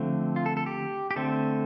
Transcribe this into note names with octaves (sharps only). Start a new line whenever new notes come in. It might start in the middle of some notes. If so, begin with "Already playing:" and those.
Already playing: D3 F3 A3 C4
F4
A4
A4
G4
G4
D3 A3 C4 A4